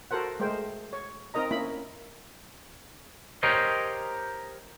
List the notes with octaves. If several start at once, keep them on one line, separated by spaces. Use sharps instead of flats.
F#4 A4 A#4 C5 F#5
G#3 A3 A#4 C5 G5
C#5
C4 D#4 A#4 D#5 A#5
A#3 C#4 E4 B5
G4 A#4 C5 C#5 D#5